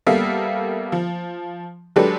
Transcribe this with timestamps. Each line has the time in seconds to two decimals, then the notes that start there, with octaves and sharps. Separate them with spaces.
0.06 G3 A#3 B3 A4 E5 F5
0.92 F3
1.96 F#3 G#3 D4 G4 A4 B4